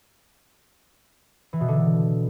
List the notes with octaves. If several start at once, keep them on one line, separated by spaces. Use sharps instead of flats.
E3
B2
D3